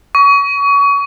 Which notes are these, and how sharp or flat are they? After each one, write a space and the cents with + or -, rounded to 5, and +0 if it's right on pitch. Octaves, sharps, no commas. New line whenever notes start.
C#6 +30